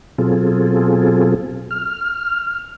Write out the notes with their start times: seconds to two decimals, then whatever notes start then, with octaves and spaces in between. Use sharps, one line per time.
0.18 B2 F#3 C4 F4 G#4 A4
1.71 F6